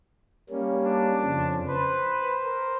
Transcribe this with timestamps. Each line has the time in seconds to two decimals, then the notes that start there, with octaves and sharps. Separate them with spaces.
0.50 G3 A#3 C#4
0.84 D4
1.21 F2 C#3 F3
1.68 B4 C5
2.44 A#4